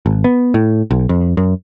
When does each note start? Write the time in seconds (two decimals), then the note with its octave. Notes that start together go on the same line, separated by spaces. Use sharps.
0.06 G#1
0.24 B3
0.54 A2
0.91 B1
1.09 F2
1.37 F#2